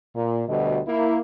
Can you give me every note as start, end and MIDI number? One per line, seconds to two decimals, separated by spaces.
0.16 0.43 46
0.48 0.81 38
0.48 0.81 47
0.48 0.81 50
0.48 0.81 55
0.48 0.81 75
0.87 1.19 58
0.87 1.19 64